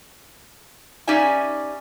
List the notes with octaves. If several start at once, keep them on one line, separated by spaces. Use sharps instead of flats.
C#4 D#4 G4 D5 E5 G#5